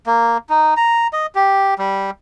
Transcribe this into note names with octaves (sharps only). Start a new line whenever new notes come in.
A#3
D#4
A#5
D#5
G4
G3